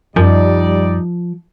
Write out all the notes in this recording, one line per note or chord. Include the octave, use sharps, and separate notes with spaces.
F#2 F3 G3 D#4 D5